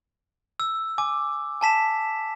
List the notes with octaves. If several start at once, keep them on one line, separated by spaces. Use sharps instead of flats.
E6
G#5 D6
G#5 A5 B6 E7